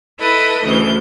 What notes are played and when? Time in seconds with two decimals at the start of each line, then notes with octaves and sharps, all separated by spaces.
0.19 E4 A4 B4 D#5 B5
0.64 D2 C#3 E3 G6